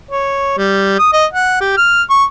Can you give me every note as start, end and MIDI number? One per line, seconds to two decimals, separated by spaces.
0.11 0.53 73
0.57 0.94 55
0.98 1.10 87
1.13 1.25 75
1.33 1.56 78
1.60 1.75 67
1.77 2.02 89
2.10 2.24 85